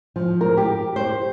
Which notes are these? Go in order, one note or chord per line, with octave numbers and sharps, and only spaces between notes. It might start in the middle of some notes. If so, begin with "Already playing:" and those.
F3
A#4
G4
C5